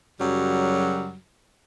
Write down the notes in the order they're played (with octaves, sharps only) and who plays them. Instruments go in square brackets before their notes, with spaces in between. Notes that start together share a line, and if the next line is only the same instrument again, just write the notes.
[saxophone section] F#2 C#3 F#3 G3